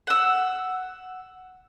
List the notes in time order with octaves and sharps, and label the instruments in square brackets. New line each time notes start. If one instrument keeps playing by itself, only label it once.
[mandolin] F#5 E6